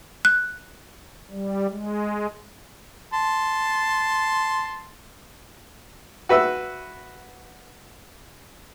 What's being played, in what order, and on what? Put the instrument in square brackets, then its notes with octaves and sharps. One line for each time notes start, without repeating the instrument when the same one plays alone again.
[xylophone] F#6
[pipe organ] G3
G#3
[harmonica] A5 C6
[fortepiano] F#4 B4 E5 E6